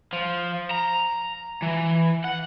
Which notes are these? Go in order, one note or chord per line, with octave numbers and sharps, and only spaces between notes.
F3
A#5
E3
F#5